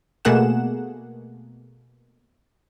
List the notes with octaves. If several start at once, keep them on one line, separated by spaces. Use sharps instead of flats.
B2 A3 A#3 G#4 F#5 E7